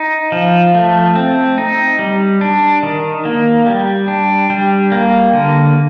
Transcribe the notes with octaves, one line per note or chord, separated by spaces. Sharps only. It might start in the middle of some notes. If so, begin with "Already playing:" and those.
Already playing: D#4
F3
A3
C4
D#4
G3
D4
D#3
A#3
G3
D4
G3
A#3
D3